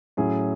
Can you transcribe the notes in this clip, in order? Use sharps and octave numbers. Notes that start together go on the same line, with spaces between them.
A2 F#3 C#4 E4 G#4